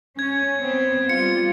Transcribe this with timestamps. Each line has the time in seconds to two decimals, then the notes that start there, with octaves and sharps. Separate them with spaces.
0.19 C#4 G#6
0.60 B3 C4
1.09 G3 F4 C#7